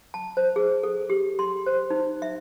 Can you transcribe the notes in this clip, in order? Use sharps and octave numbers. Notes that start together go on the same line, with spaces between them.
A5
C5
G#4
A4
G4
C6
C5
D#4
E5